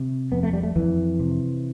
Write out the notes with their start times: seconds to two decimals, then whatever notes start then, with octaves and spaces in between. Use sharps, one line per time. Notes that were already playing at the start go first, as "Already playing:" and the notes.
Already playing: C3
0.32 F2 B3
0.43 A3
0.53 G3
0.63 A3
0.76 F2 E3
1.19 C3